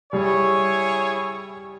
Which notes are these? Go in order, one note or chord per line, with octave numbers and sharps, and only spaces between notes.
G3 E4 G#4 C#5